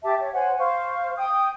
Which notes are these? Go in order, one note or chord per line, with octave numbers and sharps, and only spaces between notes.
G4 E5 A5 D6
C#5
C5 C#5 F#5 G#5
C5 F5 C#6
G5 D#6 G6